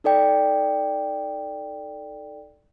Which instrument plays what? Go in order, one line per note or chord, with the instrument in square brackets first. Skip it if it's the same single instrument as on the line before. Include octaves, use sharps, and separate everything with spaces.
[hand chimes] D#4 A4 D5 G5